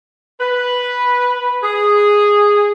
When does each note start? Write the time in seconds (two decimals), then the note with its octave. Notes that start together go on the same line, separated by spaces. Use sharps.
0.41 B4
1.63 G#4